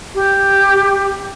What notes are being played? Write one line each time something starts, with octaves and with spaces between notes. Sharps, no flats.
G4